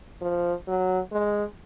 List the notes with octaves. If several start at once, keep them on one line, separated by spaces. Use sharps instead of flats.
F3
F#3
G#3